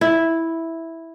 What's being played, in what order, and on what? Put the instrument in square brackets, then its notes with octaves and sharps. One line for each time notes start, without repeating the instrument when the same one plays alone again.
[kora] E4